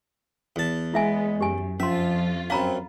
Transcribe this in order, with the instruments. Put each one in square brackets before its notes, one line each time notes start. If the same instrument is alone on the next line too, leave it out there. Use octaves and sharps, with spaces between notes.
[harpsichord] E2 A5
[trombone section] G#3 [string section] B3 [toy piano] E4 E5 G#5
[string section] F#2 [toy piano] G4 G#5
[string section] F2 F4 [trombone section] F3 [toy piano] C#4 C6 [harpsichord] E5
[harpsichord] F#2 C#4 [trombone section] C4 [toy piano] F5 A#5 B5